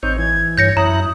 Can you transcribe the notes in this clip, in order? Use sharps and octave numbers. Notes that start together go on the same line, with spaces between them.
A1 C4 D#4 C#5 G6
E3 G#6
G2 C#5 G6 A#6 C#7
F#2 E4 A#5 D#6 F#6